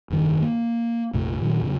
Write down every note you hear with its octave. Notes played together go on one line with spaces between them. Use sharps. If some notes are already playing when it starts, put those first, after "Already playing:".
F1 G2 D#3
A#3
A#1 F2 C3 A3
A#2 D#3 F3 F#3
E2 C#3 F#3